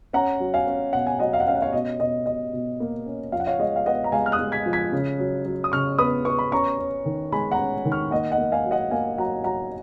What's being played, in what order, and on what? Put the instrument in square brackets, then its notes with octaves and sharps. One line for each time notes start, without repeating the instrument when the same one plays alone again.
[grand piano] C#4 F#5 A#5
F#3
F5 G#5
C#4
B2 F#5
G#5
F#3 D#5 F#5
F5
F#5
C#4 F5
F#5
C#5 F5
B2 D#5
B2 D#5
B2 D#5
B2
A#3
C#4
F3 F5
F#5
C#5 F5
G#3 D#5
F5
B3 D#5 F#5
A#5
G#3 F5 G#5
F6
D#6 F#6
G#3
G#6 B6
F3
G#6 B6
C#3
F#3
F#3
D#6
C#3 C#6 F6
B3 B5 D#6
B3 C#6
B5
C#4 A#5 C#6
C#4
D#3
G#3 G#5 B5
F#5 A#5
C#4
D#3
C#6 F6
A#3 D#5 F#5
D#5 F#5
A#3
F5 G#5
F#3
D#5 F#5
A#3 F5 G#5
F#3 F#5 A#5
F#3 F#5 A#5